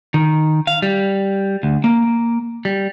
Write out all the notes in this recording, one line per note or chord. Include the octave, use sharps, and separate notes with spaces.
D#3
F5
G3
D2
A#3
G3